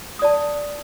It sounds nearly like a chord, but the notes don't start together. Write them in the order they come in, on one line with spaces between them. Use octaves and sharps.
D#6 D5 A5